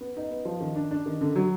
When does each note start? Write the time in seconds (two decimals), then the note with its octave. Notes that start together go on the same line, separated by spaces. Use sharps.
0.01 B3
0.17 D#4
0.31 B3
0.45 F3
0.61 D#3
0.76 D4
0.91 D4
1.06 D#3
1.21 D3
1.36 F#3